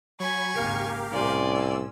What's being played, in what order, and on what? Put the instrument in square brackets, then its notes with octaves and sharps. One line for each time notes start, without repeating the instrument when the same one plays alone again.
[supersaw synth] F#3 B5 [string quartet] G#5 C#6 G#6
[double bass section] G#1 D#2 C#3 [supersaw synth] G4 A#4 F5
[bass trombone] C2 [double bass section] A2 C#4 [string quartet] D5 G#5 C6
[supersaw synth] E6